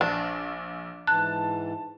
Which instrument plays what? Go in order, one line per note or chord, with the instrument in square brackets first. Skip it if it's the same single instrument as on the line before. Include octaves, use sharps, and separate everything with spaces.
[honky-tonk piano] A#1 [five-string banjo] D4
[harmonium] G#2 E3 [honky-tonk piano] A5 [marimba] F#6